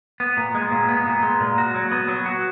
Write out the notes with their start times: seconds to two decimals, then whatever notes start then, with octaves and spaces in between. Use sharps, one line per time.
0.20 B3
0.37 A#2
0.55 G#3
0.72 A#2
0.88 B3
1.06 A#2
1.23 G#3
1.40 A#2
1.58 F#4
1.75 F#3
1.91 B3
2.08 F#3
2.26 F#4